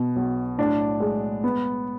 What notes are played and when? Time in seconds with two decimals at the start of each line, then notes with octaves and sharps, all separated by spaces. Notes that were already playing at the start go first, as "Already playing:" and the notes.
Already playing: B2
0.16 B1
0.58 A2 D4
1.00 G#3
1.44 B3